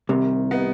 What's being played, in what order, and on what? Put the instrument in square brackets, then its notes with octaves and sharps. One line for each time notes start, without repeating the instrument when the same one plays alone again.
[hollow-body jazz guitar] C2 C3 [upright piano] D#3
[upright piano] B3 D#4